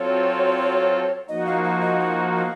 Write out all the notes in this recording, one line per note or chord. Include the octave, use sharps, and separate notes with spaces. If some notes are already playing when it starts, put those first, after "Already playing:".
Already playing: F#3 C4 F4 A4 C#5
F3 A#3 D#4 F#4 D#5
F5
F5
D#5
F#5
F5